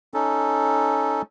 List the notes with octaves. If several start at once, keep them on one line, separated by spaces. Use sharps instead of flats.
C#4 D#4 A4